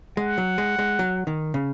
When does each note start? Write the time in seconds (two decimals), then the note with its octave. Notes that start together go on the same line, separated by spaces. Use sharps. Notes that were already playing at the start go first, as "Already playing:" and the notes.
0.17 G#3 F#5
0.38 F#3
0.58 G#3
0.79 G#3
0.99 F#3
1.27 D#3
1.54 C#3